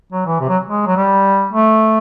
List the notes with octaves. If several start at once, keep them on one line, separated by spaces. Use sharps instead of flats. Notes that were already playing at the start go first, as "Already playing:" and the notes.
F#3
E3
C3
F#3
G#3
F#3
G3
A3